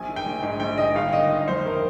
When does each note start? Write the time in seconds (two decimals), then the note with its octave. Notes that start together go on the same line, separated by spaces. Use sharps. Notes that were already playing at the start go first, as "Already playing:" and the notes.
Already playing: A#1 G#5
0.08 D#3
0.16 G5
0.26 A#1
0.43 G#2
0.60 A#1 G5
0.78 D#3 D#5
0.95 G1 F5
1.13 D#3 D#5
1.30 G1 D#5
1.48 F2 C5
1.65 G1 A#4